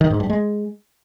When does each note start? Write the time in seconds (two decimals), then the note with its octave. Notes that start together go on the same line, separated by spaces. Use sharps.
0.01 D#3
0.10 G#2
0.20 G2
0.30 G#3